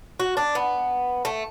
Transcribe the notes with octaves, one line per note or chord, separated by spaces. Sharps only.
F#4
D4
B3
A3